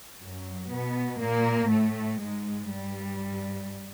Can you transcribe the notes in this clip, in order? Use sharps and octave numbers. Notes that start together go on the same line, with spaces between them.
F#2 F#3
B2 B3
A#2 A#3
A2 A3
G#2 G#3
G2 G3